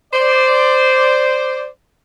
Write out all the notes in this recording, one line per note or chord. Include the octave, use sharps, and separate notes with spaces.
C5 D5